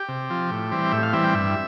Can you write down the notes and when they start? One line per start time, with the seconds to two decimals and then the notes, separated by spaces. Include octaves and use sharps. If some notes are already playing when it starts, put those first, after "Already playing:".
Already playing: G4
0.08 C3
0.30 F3 C4
0.51 A2
0.71 E3 G3 C4
0.93 A2 E5
1.03 F5
1.13 E3 G3 C4 E5
1.24 G5
1.34 G2 E5